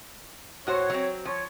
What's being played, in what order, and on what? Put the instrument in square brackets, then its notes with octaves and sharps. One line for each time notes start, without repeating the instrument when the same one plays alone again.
[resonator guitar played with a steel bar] A2 F#4 C5 [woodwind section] C#5
[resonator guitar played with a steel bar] F#3 C4
[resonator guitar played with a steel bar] F3 [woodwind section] C#5